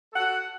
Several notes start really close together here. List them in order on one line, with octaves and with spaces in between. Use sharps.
A4 F#5 F#4